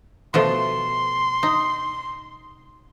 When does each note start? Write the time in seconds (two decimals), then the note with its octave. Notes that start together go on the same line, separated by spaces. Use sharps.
0.34 B2 F3 A3 C6
1.43 D#4